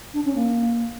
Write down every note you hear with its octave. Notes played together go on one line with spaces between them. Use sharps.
D4
C#4
A#3